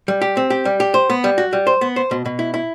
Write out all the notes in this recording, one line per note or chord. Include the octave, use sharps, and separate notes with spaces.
G3
G4
C4
G4
G3
G4
C5
B3
G3
F#4
G3
C5
B3
C5
B2
B2
E4
E4